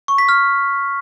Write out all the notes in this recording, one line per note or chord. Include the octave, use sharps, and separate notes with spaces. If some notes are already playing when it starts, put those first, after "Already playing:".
C#6
B6
F6